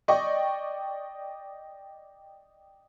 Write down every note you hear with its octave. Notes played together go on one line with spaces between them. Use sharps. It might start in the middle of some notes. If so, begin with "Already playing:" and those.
D5 D#5 G5 C#6